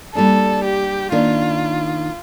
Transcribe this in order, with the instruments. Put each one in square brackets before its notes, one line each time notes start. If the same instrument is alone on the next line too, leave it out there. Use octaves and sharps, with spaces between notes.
[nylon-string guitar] G3 A#3 D4 [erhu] A4
[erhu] G4
[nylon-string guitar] D#3 A#3 D4 [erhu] F4